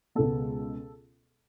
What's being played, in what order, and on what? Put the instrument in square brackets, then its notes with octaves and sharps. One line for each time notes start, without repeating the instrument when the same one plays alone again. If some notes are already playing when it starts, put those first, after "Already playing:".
[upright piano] C#2 B2 G#3 B3 A4